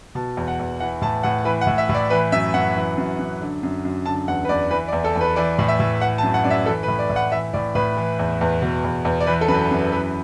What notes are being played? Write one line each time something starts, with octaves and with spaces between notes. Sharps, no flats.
B2 A5
E2
F#5
E2
E3 F#5
A2 A5
A2 F#5
E3 B4
F#5
A2
E5
A2
D5
E3 B4
F#2 E5
F#2 F#5
E3
F#2
F#2
D3
F#2
F#2
D3 A5
E2 F#5
B4
E2 D5
E3 B4
D5
E2
A4
E2
B4
E3 D5
A2
E5
A2
E3 F#5
A5
F#2
F#5
F#2 D5
E5
E3 A4
B4
A2
D5
A2
F#5
E3 E5
A2 D5
A2 B4
E3
E2
E2
B2
E2
E2
D5
E3 B4
A4
F#2 B4
F#2
E3 B4